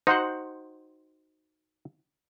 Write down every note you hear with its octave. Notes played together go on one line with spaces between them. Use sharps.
D#4 F#4 C5 F#5